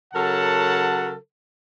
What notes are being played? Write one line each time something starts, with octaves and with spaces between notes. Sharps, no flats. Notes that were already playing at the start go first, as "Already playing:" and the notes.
C#3 F#3 A4 A#4 F#5 A5